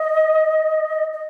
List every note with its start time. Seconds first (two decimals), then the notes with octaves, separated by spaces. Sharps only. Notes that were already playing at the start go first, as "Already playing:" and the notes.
Already playing: D#5
1.13 D#5